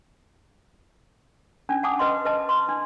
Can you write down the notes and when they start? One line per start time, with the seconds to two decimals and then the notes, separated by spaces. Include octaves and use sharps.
1.69 C#4 D4
1.83 F#5 A5 D6 D#6
1.99 B4 D#5 C6
2.25 B4 D#5 A5
2.49 C6
2.69 D4